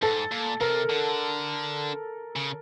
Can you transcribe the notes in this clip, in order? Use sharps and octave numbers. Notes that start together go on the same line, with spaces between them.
G#2 A4
A#2
C3 A#4
D3
C#3